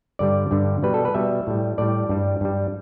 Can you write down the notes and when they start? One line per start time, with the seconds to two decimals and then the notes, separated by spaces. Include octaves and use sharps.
0.19 G2 D3 G3 D5
0.51 G2 D3 G3
0.83 B2 G3 B4
0.94 A4
1.05 B4
1.14 B2 G3 E5
1.47 A2 G3
1.78 A2 G3 D5
2.09 G2 G3
2.41 G2 G3